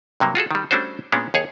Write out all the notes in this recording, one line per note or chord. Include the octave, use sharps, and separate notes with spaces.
G2 C3 F#3 A#3
F4 F#4 G#4 A4
D#3 G3
G3 A3 C#4 D4 F#4 C5
A#2 G#3 B3 C#4 D4
D#2 G#4 C#5